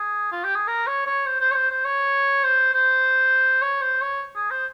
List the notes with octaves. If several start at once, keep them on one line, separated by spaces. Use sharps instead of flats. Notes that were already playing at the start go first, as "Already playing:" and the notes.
Already playing: G#4
F4
G4
G#4
A#4
C#5
C#5
C5
C5
C#5
C5
C5
C#5
C5
C5
C#5
C5
C#5
G#4
C5